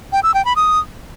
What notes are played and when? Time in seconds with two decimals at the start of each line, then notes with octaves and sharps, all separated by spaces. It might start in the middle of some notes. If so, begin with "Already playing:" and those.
0.12 G5
0.23 E6
0.34 G5
0.45 B5
0.56 D#6